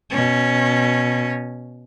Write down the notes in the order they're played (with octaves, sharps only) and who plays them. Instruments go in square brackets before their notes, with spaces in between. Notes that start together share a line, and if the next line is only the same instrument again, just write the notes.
[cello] B2 C#4